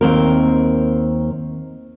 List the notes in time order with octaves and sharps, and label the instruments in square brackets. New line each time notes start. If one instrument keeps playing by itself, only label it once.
[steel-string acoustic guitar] D#2 C4 A#4